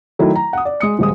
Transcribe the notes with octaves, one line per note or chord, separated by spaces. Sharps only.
D#3 F#3 A3 E4
A#5
F#5 D#6
D5
G#3 D#6 C#7
D#1 G#3 D#6